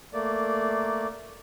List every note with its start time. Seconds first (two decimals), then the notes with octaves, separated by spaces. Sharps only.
0.13 A3 A#3 D5